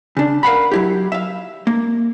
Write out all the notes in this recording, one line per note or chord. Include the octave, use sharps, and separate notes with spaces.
C#3 D4
A#4 F5 F#5 B5
F#3 E4 G4
E5 F5
A#3